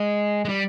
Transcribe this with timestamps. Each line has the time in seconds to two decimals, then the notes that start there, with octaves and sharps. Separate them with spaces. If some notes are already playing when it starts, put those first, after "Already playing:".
Already playing: G#3
0.45 G#3
0.49 G3